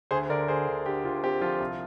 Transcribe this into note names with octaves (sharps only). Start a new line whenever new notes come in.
D2 G#4 C5
D3 A#4 D5
D3 G#4 C5
D2
D3 G4
D2 F4
C4 G4
F3 F4
C2